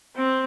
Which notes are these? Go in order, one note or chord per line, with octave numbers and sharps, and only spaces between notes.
C4